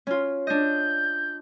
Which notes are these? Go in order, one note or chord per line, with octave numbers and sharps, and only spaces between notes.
C#4 F4
D4 D#5 G6